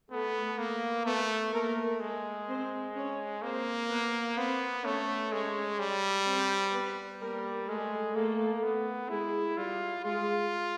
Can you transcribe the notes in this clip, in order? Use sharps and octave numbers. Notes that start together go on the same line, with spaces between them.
A3 B3 A4
A#3
A3 B3 B4
A3 A#3 A#4
G#3
C4 C5
C#4 C#5
A#3 C4 C5
B3 B4
B3 C4 C5
A3 C#4 C#5
G#3 C#4 C#5
G3
C4 C5
B3 B4
G3 A#3 A#4
G#3 A3 A4
A3 A#3 A4
B3
G#3 E4 G#4
G3 F4 G4
G#3 F4 G#4